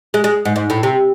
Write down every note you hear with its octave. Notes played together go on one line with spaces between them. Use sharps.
G#3
G#3
G#2
G#2
A2
C3